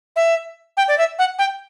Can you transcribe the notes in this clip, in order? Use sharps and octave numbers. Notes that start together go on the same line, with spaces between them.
E5
G5
D5
E5
F#5
G5